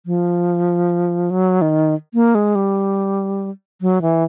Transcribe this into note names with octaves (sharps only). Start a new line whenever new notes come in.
F3
F#3
D#3
A#3
G#3
G3
F#3
E3